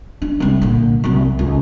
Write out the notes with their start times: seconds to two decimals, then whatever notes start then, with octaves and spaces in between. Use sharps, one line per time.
0.22 D4
0.40 C2 G3
0.62 A#2 D3
1.04 C2 F#3
1.39 C#2